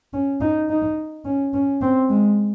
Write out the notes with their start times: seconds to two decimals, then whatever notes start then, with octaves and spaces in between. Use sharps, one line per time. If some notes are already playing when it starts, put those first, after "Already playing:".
0.13 C#4
0.41 D#4
0.70 D#4
1.25 C#4
1.54 C#4
1.81 C4
2.10 G#3